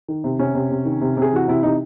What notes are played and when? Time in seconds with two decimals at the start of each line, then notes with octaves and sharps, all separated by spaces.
0.08 D#3
0.24 C3
0.39 C3 C#4
0.55 C3
0.71 C3
0.85 D#3
1.01 C3
1.17 C3 G#4
1.32 E3 F#4
1.48 C3 E4
1.63 C3 D#4